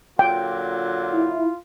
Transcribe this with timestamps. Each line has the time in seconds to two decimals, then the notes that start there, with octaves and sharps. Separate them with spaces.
0.19 A#2 D3 F#3 F4 G5
1.14 E4